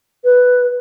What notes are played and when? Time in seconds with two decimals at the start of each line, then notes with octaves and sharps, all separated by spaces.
0.24 B4